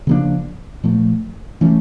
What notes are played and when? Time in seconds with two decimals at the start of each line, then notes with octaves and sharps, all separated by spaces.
0.07 C#3 F3 A#3 D4
0.84 A#2 F3 A3
1.61 E3 A3 C#4